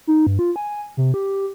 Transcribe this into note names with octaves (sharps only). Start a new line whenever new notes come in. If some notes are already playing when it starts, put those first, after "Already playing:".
D#4
G2
F4
G#5
C3
G4